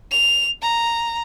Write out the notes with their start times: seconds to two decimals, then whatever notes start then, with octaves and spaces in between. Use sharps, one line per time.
0.11 F7
0.62 A#5